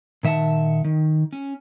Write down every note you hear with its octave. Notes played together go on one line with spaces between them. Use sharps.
A#2 D#3 E5 F#5 A5
D#3
C#4